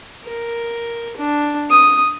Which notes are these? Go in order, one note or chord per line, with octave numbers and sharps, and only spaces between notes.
A#4
D4
D#6